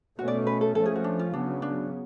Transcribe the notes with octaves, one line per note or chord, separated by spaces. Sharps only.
B2 A3 C#4 F#4
D5
B4
A4
F3 A3 C#4 A4
G#4
F#4
D4
F4
C#3 F#3 B3 D4
D4